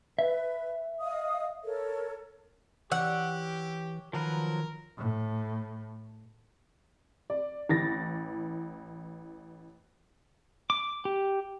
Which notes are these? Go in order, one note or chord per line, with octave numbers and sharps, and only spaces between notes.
B4 E5
D#5 F5 D#6
A4 A#4 C#5
E3 G4 C#5 F#5 E6 F#6
D#3 F3 F#3 A#4 B4
A2
D5
A1 E3 A6 A#6
D6
G4